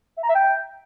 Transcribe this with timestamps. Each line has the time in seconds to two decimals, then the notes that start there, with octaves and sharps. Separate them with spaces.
0.17 E5
0.23 A#5
0.29 E5
0.35 G5